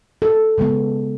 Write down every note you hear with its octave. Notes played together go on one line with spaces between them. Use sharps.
A4
C#3 G#3 B3